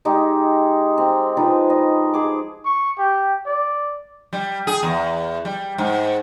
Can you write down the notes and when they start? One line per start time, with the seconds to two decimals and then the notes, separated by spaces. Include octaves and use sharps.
0.05 G#3 D#4 G4
0.98 C4
1.37 F3 D#4 B4
1.70 D#5
2.14 G#4 D6
2.65 C#6
2.98 G4
3.46 D5
4.33 G3
4.67 G#4
4.83 E2
5.45 G3
5.78 G#2